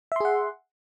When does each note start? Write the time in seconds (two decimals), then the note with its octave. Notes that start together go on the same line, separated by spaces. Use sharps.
0.12 E5
0.16 C6
0.20 G#4
0.25 F#5